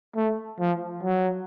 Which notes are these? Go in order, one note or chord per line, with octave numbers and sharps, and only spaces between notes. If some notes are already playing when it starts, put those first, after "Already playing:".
A3
F3
F#3